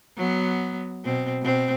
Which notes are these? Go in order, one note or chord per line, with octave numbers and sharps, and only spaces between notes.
F#3 B3
B2 C4
B2 C4